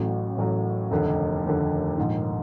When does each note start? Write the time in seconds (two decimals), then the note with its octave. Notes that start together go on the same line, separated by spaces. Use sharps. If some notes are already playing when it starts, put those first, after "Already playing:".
Already playing: A1 A2 F#3
0.37 A1 A2 F#3
0.91 F1 D#2 D3
1.45 F1 D#2 D3
1.97 A#1 G#2 D#3